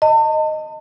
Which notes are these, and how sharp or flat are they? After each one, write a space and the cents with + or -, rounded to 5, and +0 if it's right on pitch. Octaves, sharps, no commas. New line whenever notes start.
D#5 +0 A5 +40